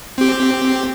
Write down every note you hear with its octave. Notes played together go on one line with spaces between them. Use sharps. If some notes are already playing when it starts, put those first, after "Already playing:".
C4 G4